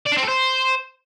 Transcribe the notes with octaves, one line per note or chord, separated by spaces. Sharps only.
D5
D4
C4
A4
C5